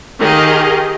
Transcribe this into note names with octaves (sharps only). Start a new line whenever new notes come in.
D#3 G4 G#4 D#5 F5